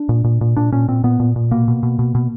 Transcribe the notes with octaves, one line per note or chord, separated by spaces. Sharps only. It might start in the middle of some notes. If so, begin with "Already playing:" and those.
Already playing: D4
A#2
A#2
A#2
A#2 D4
A#2 C#4
A#2 C4
A#2 B3
A#2
A#2
B2 A#3
B2
B2
B2
B2